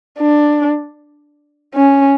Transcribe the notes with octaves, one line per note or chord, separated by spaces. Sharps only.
D4
C#4